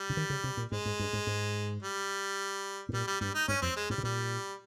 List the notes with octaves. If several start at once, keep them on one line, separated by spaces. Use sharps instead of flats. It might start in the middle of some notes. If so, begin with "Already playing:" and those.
Already playing: G3
C#3
D#3
C#3
C3
A#2
G#2 G#3
G#2
G2
G#2
G#2
G3
G#2
A#2 G3
G3
G2 G3
D#4
G2 C#4
F2 C4
G#3
G#2 G3
C3
A#2 G3